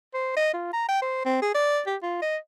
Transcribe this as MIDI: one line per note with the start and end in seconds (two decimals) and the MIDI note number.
0.14 0.36 72
0.37 0.53 75
0.53 0.70 65
0.73 0.87 82
0.88 1.00 79
1.02 1.21 72
1.25 1.38 60
1.42 1.51 68
1.55 1.81 74
1.87 1.97 67
2.03 2.18 65
2.22 2.37 75